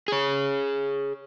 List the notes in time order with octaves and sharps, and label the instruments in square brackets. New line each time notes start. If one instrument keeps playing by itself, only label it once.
[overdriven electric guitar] G#4 C#5